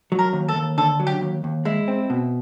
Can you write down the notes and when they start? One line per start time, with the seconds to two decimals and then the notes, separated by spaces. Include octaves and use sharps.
0.12 F#3
0.19 A#4
0.33 D#2
0.49 A4
0.55 D#2
0.78 D3 A4
1.00 F#3
1.07 G4
1.22 D#2
1.44 D#2
1.65 G#3 E4
1.88 C4
2.10 B2